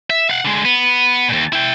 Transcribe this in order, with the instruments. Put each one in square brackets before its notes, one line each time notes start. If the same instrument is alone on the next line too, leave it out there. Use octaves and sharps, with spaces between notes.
[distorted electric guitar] E5
F5 F#5
D3 G#3
B3
D#2 A#2
E4 G5